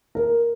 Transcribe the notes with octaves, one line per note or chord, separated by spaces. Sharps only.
A#4